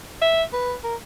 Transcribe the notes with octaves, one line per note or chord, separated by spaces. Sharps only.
E5
B4
A#4